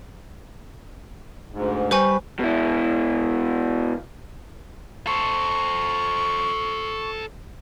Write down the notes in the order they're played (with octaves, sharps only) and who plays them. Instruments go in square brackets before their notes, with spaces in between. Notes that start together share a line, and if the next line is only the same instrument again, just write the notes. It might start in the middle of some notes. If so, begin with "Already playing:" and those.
[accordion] D2 G#2
[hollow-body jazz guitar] G3 [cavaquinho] B4 C#6 [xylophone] C5 G#5
[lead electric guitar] B2 E4
[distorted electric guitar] A4 C5 [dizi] C#6